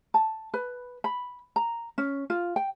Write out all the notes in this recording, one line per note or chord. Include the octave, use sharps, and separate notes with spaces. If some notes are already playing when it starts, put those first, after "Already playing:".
A5
B4
B5
A#5
C#4
F4
G5